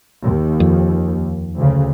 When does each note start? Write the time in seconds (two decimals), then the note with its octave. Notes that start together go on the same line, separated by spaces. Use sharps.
0.24 D#2
0.60 F2
1.56 D2 C#3